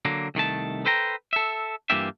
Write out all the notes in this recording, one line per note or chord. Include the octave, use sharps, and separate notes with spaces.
D3 F#3 A#3
C2 D#3 A3 A5
A4 B4 C5 G5 A#5
A4 E5
G2 E3 A#3 F4 G4 E5